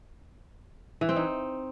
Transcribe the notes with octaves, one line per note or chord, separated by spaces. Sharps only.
E3
C4
D#4